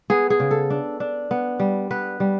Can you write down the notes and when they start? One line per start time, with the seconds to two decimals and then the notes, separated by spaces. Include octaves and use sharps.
0.10 B3 G#4
0.30 G#4
0.40 C#3
0.51 A4
0.70 D4
1.00 D4
1.31 B3
1.60 G3
1.91 B3 B4
2.20 G3